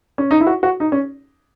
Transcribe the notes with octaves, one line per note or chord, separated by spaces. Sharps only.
C#4
D#4
E4
F#4
F#4
D#4
C#4